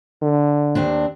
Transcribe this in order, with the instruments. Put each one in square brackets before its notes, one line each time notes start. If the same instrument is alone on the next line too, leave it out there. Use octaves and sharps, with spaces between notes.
[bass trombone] D3
[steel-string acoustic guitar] D#2 C4 D4